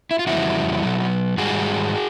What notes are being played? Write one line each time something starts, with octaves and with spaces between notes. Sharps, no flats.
E4
F4
F2 C#3 E3 G3 E4 F#4
B2 F#3
G#2 D#3 G3 F#4 G#4